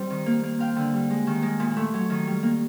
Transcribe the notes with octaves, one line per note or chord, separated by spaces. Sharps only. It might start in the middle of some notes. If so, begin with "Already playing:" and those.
Already playing: G3 C4
D#3
A#3
A#3
C4 F5 G5
D3
G3
G#3
D#3
G#3
A#2
A3
F#3
D#3
G3
A#3